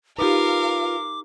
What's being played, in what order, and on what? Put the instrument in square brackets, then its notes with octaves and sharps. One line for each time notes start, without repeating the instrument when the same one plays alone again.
[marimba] D#4 G4 [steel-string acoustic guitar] F4 B4 [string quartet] A#4 F5 [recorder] D6